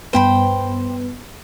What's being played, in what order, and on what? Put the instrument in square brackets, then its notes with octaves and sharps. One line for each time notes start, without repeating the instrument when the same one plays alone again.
[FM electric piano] G2 B3 B4 [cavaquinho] C5 G5 B5